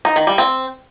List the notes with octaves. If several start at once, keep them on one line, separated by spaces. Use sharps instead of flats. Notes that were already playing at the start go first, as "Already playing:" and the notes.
D#4
D#3
G3
C4